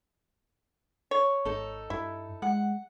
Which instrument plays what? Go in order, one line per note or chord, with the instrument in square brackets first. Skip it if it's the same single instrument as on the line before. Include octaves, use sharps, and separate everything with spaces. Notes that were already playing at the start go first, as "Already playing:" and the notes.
[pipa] C#5
[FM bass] G#1 [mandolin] D#4 A4
[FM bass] G2 [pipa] E4
[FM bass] G#3 [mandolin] F#5